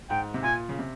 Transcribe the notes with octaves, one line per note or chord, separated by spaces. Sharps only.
G#2 G5
C3
A#2 G#5
C#3
C3